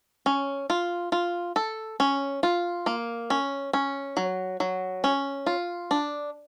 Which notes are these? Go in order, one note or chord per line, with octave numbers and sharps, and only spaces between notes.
C#4
F4
F4
A4
C#4
F4
A#3
C#4
C#4
F#3
F#3
C#4
F4
D4